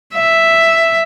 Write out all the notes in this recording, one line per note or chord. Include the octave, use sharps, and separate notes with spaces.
E5